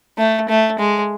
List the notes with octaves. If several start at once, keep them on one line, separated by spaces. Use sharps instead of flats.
A3
A3
G#3